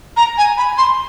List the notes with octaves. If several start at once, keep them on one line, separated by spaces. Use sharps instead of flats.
A#5
G#5
B5
C6